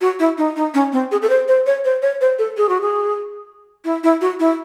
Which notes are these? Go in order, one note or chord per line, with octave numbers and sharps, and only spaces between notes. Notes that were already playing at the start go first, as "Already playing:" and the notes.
F#4
E4
D#4
D#4
C#4
C4
G#4
A4
C5
C5
C#5
C5
C#5
C5
A4
G#4
F#4
G#4
E4
E4
F#4
E4